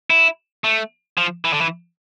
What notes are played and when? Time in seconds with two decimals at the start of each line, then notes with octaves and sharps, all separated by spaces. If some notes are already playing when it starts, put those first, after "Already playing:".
0.10 E4
0.64 A3
1.18 F3
1.45 E3
1.53 D3
1.61 E3